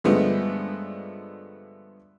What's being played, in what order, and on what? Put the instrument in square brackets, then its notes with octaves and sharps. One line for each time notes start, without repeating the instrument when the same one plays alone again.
[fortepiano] G2 D3 F3 G#3 A3 B3